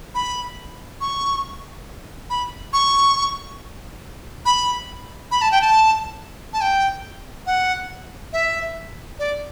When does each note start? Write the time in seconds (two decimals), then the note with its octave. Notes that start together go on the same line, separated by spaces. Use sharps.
0.15 B5
1.01 C#6
2.30 B5
2.73 C#6
4.45 B5
5.31 B5
5.42 A5
5.52 G5
5.61 A5
6.53 A5
6.61 G5
7.46 F#5
8.33 E5
9.19 D5